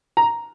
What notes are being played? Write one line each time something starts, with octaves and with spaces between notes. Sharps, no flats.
A#5